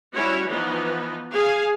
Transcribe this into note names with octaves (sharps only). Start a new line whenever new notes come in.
G3 C#4 E4 F#4 C#5
E3 F3 B3 D#4
G#4 F5 G#5